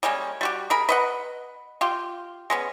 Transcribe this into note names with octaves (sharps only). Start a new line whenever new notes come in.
G3 G#3 A#3 C#4
G3 F#4 G4
G#4 A#4 B5
B4 D#5 F#5
F4 G4
G#3 B3 C#4